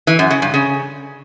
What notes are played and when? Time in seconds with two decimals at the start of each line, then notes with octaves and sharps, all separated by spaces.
0.07 E3
0.19 F#2
0.30 C#3
0.42 G2
0.54 C#3